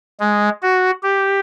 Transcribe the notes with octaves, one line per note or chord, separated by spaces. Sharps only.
G#3
F#4
G4